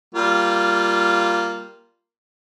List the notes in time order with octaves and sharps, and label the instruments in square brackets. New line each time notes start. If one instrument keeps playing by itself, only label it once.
[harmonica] G3 A#3 F4